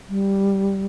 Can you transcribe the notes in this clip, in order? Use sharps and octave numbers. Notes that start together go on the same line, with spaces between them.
G3